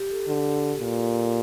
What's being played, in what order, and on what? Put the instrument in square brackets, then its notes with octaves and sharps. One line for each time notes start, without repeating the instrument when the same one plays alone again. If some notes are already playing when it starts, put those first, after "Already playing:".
Already playing: [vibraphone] G4
A4
[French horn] D3
A#2